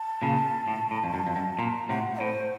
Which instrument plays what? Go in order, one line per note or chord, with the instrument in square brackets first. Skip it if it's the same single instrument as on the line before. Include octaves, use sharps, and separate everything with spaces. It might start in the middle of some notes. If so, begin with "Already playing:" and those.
Already playing: [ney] A5
[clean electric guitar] A#2 C#3
A2
A2
F2
F#2
F2
F#2
[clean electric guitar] A#2 [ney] A#5
[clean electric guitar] A2 C3 [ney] F#5
[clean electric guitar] A2 [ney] C5